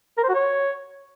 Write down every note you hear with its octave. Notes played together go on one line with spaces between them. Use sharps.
A#4
C5
F#4
C#5